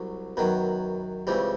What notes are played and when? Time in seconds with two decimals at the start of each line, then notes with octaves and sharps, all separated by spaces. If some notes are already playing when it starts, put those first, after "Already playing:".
Already playing: C2 F#3
0.37 F#2 D#3 F#3 B3
1.27 C#2 C#3 E3 G3 C4